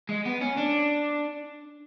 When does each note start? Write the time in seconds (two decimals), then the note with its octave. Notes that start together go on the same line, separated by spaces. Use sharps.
0.09 G#3
0.26 B3
0.41 C#4
0.58 D4